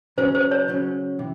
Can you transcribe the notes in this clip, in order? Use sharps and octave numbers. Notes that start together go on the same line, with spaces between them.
C#3 F#3 C#4 C5
C5
C#5
C#3 F#3 C#4
C3 E3